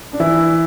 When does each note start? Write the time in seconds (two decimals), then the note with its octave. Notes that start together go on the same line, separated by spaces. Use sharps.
0.13 D4
0.20 E3 E4